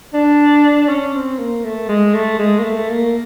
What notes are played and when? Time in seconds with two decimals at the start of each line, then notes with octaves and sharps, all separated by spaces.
0.14 D4
0.89 C#4
1.14 C4
1.39 A#3
1.64 A3
1.89 G#3
2.14 A3
2.39 G#3
2.59 A#3
2.64 A3
2.89 A#3